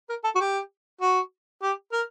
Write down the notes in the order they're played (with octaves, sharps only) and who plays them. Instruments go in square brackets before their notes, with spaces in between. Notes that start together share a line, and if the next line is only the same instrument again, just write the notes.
[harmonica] A#4
A4
F#4
G4
F#4
G4
A#4